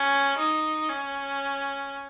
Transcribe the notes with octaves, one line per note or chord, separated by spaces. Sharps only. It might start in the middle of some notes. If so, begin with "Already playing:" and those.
Already playing: C#4
D#4
C#4